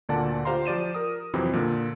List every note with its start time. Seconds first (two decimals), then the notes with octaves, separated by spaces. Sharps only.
0.09 D2 A#2 D3 D5 F#5 A5
0.45 F4 G4 C5 F5 A#5 C6
0.66 F3 G4 D5 D#7 E7
0.95 A#4 D#6
1.34 F2 C3 E3 F#3 C4 E4
1.53 A#2 D3